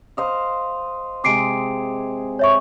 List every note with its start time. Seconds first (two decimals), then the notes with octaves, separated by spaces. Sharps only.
0.17 C5 D#5 F5
1.24 C3 G#3 D6 C7 D7
2.39 C#5 E5 C#6